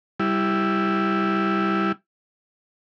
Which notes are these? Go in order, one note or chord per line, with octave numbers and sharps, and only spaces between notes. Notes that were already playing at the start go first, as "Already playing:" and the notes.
G3 E4